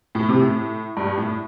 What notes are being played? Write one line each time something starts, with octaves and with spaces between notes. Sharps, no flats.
A2
C3
A2
G2
A2